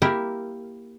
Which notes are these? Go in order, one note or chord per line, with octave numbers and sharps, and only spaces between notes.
A#3 E4 G4 A#4